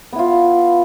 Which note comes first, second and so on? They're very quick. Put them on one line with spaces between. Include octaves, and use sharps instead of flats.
B3 E4 F4